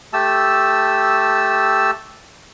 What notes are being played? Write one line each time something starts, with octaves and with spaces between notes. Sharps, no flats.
A3 G4 A5 E6